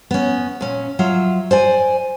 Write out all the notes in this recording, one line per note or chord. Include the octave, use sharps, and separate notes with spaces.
B3 C#4
A#2 C#4
F#3 F4 E5
C5 D5 G#5